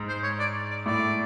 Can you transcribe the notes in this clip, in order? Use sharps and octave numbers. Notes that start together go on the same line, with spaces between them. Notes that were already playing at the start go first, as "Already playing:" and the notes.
Already playing: G#2
C5
C#5
D5
D5
A2 D5